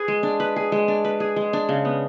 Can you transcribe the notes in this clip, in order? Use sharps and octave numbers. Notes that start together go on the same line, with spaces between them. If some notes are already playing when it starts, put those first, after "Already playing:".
Already playing: G#4 B4
G#3
D4
B4
G#4
G#3
D4
B4
G#4
G#3
D4
C#3
B3